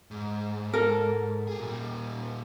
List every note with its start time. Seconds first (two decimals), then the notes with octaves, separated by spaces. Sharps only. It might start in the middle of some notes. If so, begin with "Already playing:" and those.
0.11 G#2
0.73 A4 A#4
1.47 G4 G#4
1.61 A#2 G3